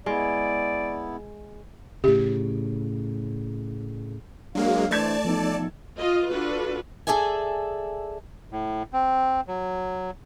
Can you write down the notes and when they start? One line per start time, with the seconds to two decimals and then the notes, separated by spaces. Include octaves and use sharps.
0.06 G#3 B3 E4 D5
2.04 A2 C#3 G4
4.55 F#3 G#3 A#3 D4 F5
4.91 E3 A3 C5 D5 A5 G#6 E7
5.25 B1 E2 F3 B3 D#4 A4
5.97 F4 D#5
6.27 D4 F4 F#4 A4 B4
7.07 G#4 A4 D5 E5 G#5
8.52 A2
8.93 C4
9.48 F#3